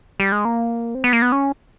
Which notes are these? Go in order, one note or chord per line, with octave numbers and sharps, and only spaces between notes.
G3
G#3
A#3
C4
B3
A#3
B3
C#4